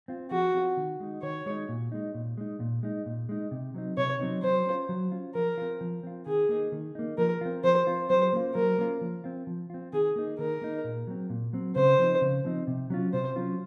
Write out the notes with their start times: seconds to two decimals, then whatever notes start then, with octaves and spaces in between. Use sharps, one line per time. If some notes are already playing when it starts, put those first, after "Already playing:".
0.08 C4 F4
0.31 F3 F#4
0.54 C4 F4
0.77 D#3
1.00 G#3 D#4
1.23 D#3 C#5
1.46 G#3 D#4
1.69 A#2
1.92 G#3 D#4
2.15 A#2
2.37 G#3 D#4
2.60 A#2
2.83 G#3 D#4
3.06 A#2
3.29 G#3 D#4
3.51 C3
3.75 F#3 C4 D#4
3.97 C3 C#5
4.20 F#3 C4 D#4
4.43 F#3 C5
4.66 C#4 F4
4.89 F#3
5.11 C#4 F4
5.35 F3 A#4
5.58 C4 F4
5.81 F3
6.03 C4 F4
6.26 D#3 G#4
6.49 A#3 D#4
6.72 D#3
6.95 A#3 D#4
7.18 F3 A#4
7.41 C4 F4
7.64 F3 C5
7.87 C4 F4
8.10 F#3 C5
8.33 A#3 C#4 F4
8.55 F#3 A#4
8.78 A#3 C#4 F4
9.01 F3
9.24 C4 F4
9.47 F3
9.70 C4 F4
9.93 D#3 G#4
10.16 A#3 D#4
10.39 D#3 A#4
10.61 A#3 D#4
10.84 A#2
11.07 F#3 C4
11.30 A#2
11.53 F#3 C4
11.76 C#3 C5
11.99 F3 C4 D#4
12.21 C#3
12.44 F3 C4 D#4
12.67 C3
12.90 F#3 C#4 F4
13.13 C3 C5
13.36 F#3 C#4 F4